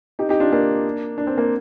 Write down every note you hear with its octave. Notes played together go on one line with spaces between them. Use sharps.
D#4 G4
D#4 G4
D4 F4
A#3 D4
D4
C4
A#3